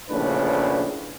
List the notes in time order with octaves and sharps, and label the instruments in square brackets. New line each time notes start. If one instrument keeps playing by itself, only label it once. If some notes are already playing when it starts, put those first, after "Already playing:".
[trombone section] A#1 A2 C#3 D4 B4